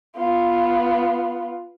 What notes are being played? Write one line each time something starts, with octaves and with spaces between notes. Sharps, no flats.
B3 F4